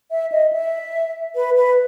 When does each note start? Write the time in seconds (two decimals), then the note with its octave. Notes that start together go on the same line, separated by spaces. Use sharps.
0.11 E5
0.32 D#5
0.53 E5
1.36 B4
1.56 B4